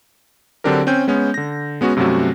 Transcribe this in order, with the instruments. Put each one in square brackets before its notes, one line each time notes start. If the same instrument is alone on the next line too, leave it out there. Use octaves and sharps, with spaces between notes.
[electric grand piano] D3 F#3 C4 D4 G4 A#4
C4 C#4 G5 G6
G#3 B3 C#4
D3 A#6
G#3 B3 C#4 F#4
G2 C3 F#3 A3 C#4 F#4